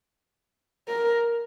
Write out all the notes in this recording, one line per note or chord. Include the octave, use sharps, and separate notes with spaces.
A#4